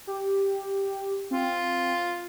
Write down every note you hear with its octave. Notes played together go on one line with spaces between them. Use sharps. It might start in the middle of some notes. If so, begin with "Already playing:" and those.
G4
C4 F4